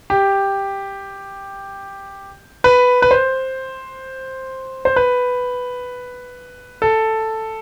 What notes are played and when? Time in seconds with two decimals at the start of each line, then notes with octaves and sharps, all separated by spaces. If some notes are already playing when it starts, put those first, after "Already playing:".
0.10 G4
2.64 B4
3.02 B4
3.11 C5
4.85 C5
4.96 B4
6.82 A4